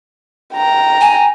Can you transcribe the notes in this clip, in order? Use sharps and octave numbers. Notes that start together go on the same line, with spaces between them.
G5 A#5
G#5